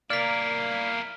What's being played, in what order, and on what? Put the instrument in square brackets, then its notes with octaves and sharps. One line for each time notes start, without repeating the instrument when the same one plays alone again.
[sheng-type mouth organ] A#3 F5 [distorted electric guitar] E4 A#4 [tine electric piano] D5 [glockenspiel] F6 B6